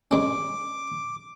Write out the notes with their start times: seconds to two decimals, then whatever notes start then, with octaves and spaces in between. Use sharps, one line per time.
0.11 G2 G#3 C#4 D6